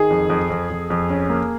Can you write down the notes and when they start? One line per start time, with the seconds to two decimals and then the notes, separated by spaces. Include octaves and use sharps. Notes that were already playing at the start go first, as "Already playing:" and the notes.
Already playing: D#3 G#4
0.10 F2
0.30 F2
0.50 F2
0.70 F2
0.90 F2
1.10 C#4
1.29 A#3